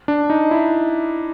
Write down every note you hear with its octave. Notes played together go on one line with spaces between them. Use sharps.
D4
D#4
E4